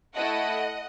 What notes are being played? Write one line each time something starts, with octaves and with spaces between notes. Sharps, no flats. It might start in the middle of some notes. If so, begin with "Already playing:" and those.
A3 E4 A4 D#5 F#5